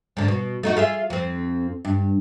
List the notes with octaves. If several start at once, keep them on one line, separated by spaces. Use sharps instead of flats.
G#2 D3
B2
A3 D#4 F#4
F4 G#4 E5
F2 C4
G2